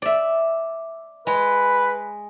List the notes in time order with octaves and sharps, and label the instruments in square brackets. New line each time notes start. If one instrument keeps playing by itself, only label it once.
[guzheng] D5 E5
[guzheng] G#3 [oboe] B4